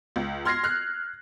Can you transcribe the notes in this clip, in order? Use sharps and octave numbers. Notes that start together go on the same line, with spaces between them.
C#2
C6 F6 G#6 A#6 C7
F6 F#6 C7